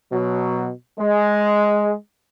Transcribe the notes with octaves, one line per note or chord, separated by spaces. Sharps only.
B2 F#3
G#3